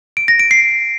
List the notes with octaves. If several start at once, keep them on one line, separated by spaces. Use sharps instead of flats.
D7
A#6
D7
C7